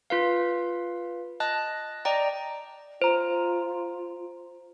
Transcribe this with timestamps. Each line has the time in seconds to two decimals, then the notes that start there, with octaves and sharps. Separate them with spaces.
0.10 F4 B4 F5
1.40 D#5 A5 F#6
2.05 D5 D#5 G5 A#5
3.02 F4 C5 A#5